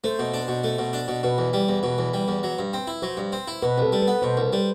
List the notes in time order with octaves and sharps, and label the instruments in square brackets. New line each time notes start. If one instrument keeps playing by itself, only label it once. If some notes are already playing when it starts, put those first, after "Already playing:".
[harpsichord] A3 [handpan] C5
[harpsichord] B2
D4
B2
A3
B2
D4
B2
[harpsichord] B2 [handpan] B4
[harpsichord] E2
G3
E2
[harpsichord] B2 [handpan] B4
[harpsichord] E2
G3
E2
F#3
G2
C4
E4
[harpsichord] F#3 [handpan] C5
[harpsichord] G2
C4
E4
[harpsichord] B2 [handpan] B4
[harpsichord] C2 [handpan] A4
[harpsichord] G3
[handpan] B4
[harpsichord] B3
[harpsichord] B2 [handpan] C5
[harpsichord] C2
G3